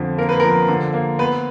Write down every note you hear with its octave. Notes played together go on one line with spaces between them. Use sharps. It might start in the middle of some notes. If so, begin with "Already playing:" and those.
Already playing: F2 D3
A#3 A#4
B4
F3 A#4
D3
A#3
B3 B4